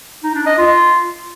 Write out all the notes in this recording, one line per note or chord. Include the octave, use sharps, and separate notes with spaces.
D#4
D4
D#5
F4